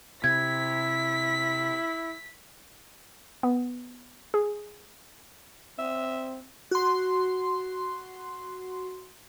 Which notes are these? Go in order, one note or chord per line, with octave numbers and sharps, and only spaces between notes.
C3 E4 G#6 B6
B3
G#4
C4 E5
F#4 C6